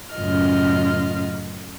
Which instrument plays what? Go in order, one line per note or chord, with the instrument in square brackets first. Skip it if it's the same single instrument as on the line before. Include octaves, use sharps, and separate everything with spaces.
[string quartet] F#2 A2 C#3 F4 D#5 F6